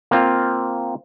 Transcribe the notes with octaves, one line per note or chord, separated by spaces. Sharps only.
A#3 C4 F4